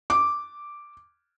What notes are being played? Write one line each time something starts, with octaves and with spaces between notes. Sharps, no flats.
D6